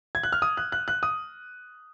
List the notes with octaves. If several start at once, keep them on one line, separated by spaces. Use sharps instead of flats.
G#6
F#6
F6
D#6
F#6
F#6
F#6
D#6